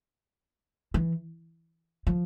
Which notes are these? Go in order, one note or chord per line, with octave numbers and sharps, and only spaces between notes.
E3
F3